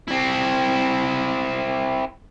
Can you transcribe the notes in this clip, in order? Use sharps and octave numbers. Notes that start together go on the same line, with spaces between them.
C4 E4